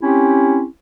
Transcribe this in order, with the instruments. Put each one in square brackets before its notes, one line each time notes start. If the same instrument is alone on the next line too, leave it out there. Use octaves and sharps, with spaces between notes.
[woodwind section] C4 C#4 E4 G4